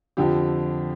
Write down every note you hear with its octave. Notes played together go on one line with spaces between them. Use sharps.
F2 D3 F3 G4